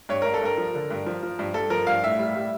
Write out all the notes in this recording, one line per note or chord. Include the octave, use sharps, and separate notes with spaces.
G2 C#5
G2 A#4
A4
G2 A#4
F3
D3
G2
F3
F3
G2
G2 A4
F3 A#4
G2 F5
A2 E5
G3
G3